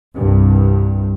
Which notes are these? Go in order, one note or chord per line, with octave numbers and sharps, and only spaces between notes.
C2 G2